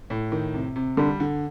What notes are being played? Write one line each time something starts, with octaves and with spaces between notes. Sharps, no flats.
A2
D#3
C3
C3
D3 G3
D3